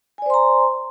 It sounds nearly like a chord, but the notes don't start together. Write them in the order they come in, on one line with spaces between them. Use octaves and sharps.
G#5 D5 C5 C6 A#5